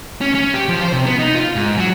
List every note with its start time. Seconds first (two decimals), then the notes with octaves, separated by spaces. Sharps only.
0.21 C#4
0.35 C#4
0.54 G4
0.68 F3
0.81 C5
0.93 C3
1.06 B3
1.19 D#4
1.36 F4
1.55 G#2
1.77 F#3